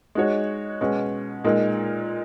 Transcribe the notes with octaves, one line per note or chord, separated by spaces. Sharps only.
G#3 D#4 F#4 C#5
B2 G#3 C#4
A#2 G#3 D#4 A#4